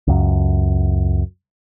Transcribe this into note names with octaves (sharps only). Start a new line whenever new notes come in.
C#2 F#2